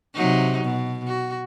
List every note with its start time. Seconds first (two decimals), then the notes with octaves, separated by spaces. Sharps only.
0.14 C3 F#3 D#4
0.63 B2
1.07 F#4